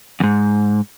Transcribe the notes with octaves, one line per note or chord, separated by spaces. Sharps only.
E2 G#2